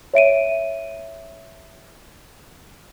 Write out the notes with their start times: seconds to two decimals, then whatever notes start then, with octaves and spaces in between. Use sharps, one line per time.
0.14 C#5 E5 D7 D#7